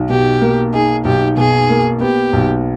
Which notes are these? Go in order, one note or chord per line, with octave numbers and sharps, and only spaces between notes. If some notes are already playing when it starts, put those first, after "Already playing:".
Already playing: B1 D#4
B2 G4
A#3
D#4 G#4
B1 G4
B2 G#4
A#3
B3 G4
B1